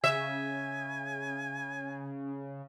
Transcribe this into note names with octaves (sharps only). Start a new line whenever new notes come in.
C#3 E5 G#5